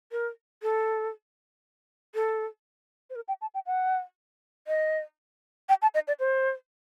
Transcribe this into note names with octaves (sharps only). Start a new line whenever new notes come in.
A#4
A4
A4
C5
A#4
G5
A5
G5
F#5
D#5
G5
A5
D#5
D5
C5